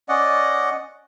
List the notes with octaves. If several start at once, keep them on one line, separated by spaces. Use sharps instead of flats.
C#4 D5 D#5 F#5